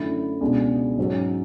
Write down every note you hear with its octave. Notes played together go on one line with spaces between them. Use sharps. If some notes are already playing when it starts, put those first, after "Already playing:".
Already playing: F#2 D3 A3 E4
C#2 B2 G#3 D4
G#2 F#3 C#4 F#4